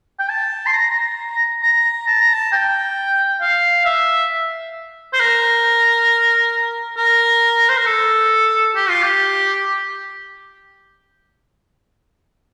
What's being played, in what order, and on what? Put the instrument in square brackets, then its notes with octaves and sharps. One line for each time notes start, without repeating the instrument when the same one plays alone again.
[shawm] G5
A5
C6
A#5
A#5
A5
A#5
A5
G5
F5
E5
C5
A#4
A#4
C5
A#4
A4
G4
F4
G4